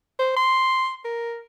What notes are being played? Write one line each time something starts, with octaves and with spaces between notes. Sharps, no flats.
C5
C6
A#4